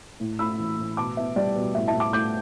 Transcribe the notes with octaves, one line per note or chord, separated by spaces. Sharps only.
A2
A3 B5 E6
E3
A2
B2 A5 D6
B3 E5
G3 D5
B2
A2 E5
E5 A5
A2
A5 D6
A3 D6 G6